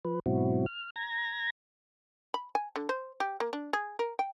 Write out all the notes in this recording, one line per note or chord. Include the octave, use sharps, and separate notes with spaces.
F3 B4
G#2 B2 F#3 C4 E4 F#4
F6
A#5 G#6 A#6
B5
G#5
D3
C5
G4
A#3
D4
G#4
A#4
G5